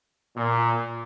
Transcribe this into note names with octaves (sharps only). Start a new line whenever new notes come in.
A#2